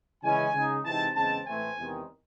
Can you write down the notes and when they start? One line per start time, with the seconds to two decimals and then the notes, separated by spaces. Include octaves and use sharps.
0.23 C#3 E3 G#3 C#4 E4 G#5
0.54 C#3 G#3 D#4
0.85 C3 E3 G#3 C4 D#4 A5
1.15 E2 C#3 G#3 C4 A5
1.46 A2 E3 A3 C4 G#5
1.78 E2 C3 D#3 G#3